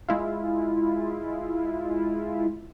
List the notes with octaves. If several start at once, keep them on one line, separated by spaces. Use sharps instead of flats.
G#3 E4 F4